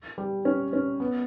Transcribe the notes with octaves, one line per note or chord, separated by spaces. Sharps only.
G3
C#4
C#4
B3